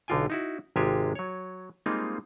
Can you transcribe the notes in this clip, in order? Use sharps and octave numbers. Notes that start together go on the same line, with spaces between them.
B1 D3 D#4 F4 G5 G#5
D#4 E4 F#4
G#1 C3 G#3 F4 G4 G#5
F#3 C#5
G3 G#3 A#3 C4 D#4 F4